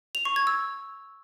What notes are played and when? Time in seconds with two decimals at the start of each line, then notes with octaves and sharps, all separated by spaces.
0.15 F7
0.25 C#6
0.36 G#6
0.47 E6